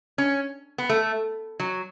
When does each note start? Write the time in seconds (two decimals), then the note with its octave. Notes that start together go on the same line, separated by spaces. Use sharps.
0.18 C#4
0.78 B3
0.89 A3
1.60 F#3